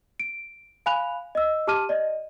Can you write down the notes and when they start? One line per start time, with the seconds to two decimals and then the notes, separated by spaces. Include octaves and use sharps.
0.20 D7
0.86 F5 G#5 B5 F#6 F7
1.35 D#5 E6
1.67 G4 A5 D6 F6 D#7
1.89 D5 D#5